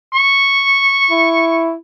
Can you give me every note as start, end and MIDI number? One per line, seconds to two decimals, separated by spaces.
0.14 1.67 85
1.10 1.73 64